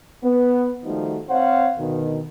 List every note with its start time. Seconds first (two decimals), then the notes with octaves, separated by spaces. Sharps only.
0.23 B3
0.85 D#3 F3 G3 A3 D#4 F#4
1.29 C4 C5 C#5 F5 F#5
1.78 D2 B2 D#3